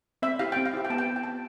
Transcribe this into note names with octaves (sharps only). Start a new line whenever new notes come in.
C4 E5
E4 G4 F5
C4 G5
F5
E4 G4
G5
B3 A5
G5
F4
G5
B3 A5